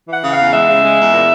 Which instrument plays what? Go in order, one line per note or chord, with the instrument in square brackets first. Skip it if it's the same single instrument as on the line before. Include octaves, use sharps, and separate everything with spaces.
[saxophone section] E3 F#5
C#3
F5
E2
G#3 E5
C#3
G#3
E2
A#2